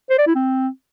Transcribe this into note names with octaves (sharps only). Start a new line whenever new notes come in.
C5
D5
E4
C4